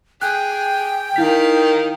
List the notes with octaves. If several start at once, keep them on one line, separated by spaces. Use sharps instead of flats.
G#4 G5 F#6
D#3 D#4 E4 F5 B6